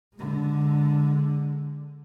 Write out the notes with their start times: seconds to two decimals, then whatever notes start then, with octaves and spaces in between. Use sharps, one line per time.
0.16 D3 G#3